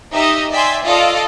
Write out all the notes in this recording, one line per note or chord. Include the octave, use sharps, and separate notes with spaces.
D#4 G4 D#5 E5
D5 E5 G5 G#5 C6
F4 A4 D5 D#5 F5